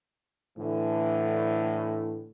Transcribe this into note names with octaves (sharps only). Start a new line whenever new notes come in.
A2 D3 E3